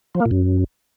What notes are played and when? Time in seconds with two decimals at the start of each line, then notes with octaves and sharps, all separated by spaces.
0.15 F3
0.20 A#3
0.26 A#2
0.31 F#2